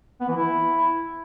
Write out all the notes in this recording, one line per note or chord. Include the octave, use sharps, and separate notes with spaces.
B3
E3
E4